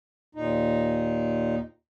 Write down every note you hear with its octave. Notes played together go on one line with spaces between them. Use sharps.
D#2 A#2 D#4